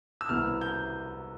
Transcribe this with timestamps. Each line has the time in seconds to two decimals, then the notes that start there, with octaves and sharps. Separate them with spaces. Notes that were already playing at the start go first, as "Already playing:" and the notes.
0.21 E6
0.29 C2 B2 B3 E4 F6
0.61 G6